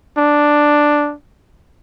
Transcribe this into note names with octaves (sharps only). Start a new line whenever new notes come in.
D4